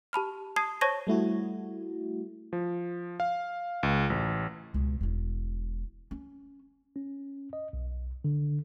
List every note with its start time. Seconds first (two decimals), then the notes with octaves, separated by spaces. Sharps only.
0.13 G4 A5 B5 F6
0.56 A5 D#6 G#6 C7
0.81 C5 C#5 A5 C#6 G#6 A#6
1.07 G3 A3 E4 F#4
2.53 F3
3.20 F5
3.83 C#2
4.10 A1
4.74 C#2 B2
5.01 E1 E4
6.11 C#4
6.96 C#4
7.53 D#5
7.73 B1
8.24 D3